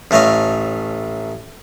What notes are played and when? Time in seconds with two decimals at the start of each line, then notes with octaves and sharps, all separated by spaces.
0.11 A1 A3 C#5 D#5 F5